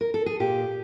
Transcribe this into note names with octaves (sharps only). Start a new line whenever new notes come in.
A#4
A4
G#4
A#2 G4